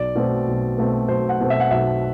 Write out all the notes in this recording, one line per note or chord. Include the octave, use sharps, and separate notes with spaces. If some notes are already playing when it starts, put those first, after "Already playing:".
Already playing: B1 D5
B2 A3 C4
B1
B2 A3 C4
B1 C5
F#5
B2 A3 C4
E5
F#5
B1 E5